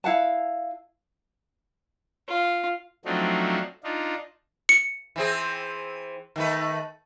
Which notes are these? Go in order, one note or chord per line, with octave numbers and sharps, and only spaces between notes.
E4 F5 F#5 A5
F4
F3 F#3 A3 C4 D4 D#4
D4 D#4 F4
C#7
E3 C4 G#4
D#3 A3 B4